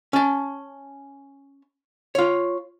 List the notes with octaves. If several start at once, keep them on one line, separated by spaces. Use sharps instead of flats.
C#4 A5
F4 C#5